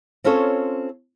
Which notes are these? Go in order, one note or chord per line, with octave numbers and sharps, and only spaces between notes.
C4 C#4 F4 A4 C#5